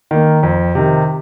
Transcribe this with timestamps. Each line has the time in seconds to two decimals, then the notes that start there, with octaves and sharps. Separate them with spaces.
0.11 D#3 A#3
0.43 F2
0.75 C3 D#3